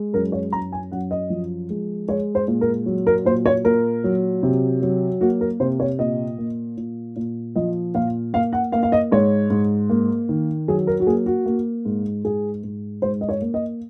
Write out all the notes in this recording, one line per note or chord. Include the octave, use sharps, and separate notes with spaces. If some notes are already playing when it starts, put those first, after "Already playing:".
Already playing: G#3
F#2 A#4
C#5
F#2 A#5
G#5
F#2 F#5
D#5
F3
G#3
G#3 C#5
C5
A#2
A#4
F#3
A#4
A#2 C5
C#5
A#2 A#4
F#3
C3
F#3
A#3 F#4
A#4
C3 C5
C#5
A#2 D#5
A#3
A#2
A#2
F3 D#5
A#2 F5
A#3 F5
F#5
A#3 F5
F5
D#5
G#2 C#5
G#2
A#3
D#3
F#3 G#4
A#4
F#4
A#3 G#4
F#4
A#3
G#2
G#2 G#4
G#2
G#2 C5
D#5
C#5
A#3
D#5